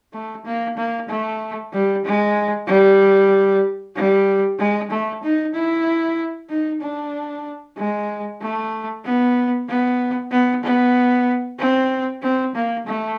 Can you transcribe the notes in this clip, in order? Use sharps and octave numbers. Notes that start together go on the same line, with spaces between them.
A3
A#3
A#3
A3
G3
G#3
G3
G3
G#3
A3
D#4
E4
D#4
D4
G#3
A3
B3
B3
B3
B3
C4
C4
A#3
A3